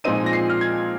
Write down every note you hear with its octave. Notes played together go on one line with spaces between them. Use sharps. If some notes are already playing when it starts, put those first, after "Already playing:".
A#2 F3 G#3 C4 D#4 D#7
A#6
C7
F6
G#6